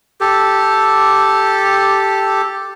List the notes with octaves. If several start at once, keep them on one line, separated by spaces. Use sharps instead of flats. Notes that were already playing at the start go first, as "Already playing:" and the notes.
G4 A4